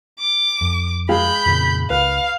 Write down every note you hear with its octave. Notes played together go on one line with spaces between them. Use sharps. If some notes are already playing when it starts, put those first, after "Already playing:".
D6
F2
G#3 F5 G5 B5 G6
F2 A#2 C#3
C#2 B4 F5